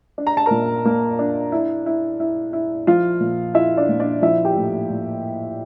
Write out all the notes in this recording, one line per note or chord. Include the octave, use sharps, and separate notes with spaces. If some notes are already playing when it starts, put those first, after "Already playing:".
D4
A#5
A5
A#2 A#4 A#5
A#3
D4
E4
E4
E4
E4
F3 F4 F5
A#2
E4 F4 E5
D4 D5
A#2
D4 D5
F3 E4 E5
G4 G5
A2
A2